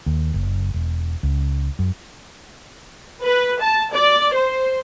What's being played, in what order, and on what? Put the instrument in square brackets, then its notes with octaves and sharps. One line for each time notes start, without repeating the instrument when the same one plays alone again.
[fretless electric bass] D#2
F#1
E1
C#2
F#2
[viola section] B4
A5
D5
C5